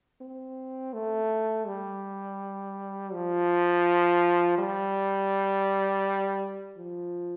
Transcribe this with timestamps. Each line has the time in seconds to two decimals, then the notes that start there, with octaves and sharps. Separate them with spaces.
0.21 C4
0.93 A3
1.66 G3
3.13 F3
4.58 G3
6.77 F3